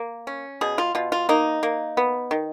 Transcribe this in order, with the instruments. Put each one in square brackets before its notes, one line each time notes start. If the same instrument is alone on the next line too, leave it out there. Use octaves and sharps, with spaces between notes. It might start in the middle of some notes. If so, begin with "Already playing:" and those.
Already playing: [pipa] A#3
C#4
B2 G#4
F4
B2 F4
F4
A#3 D#4
A#3
B3
D#3